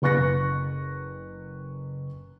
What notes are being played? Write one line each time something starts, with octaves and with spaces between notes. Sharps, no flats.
F#1 B4 C#6 F#6 A#6 C#7